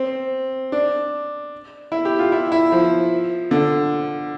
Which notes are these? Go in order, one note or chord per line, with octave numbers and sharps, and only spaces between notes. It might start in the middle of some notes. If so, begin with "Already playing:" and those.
Already playing: C4
D4
E4
G4
F4
E4
E4
F3
D3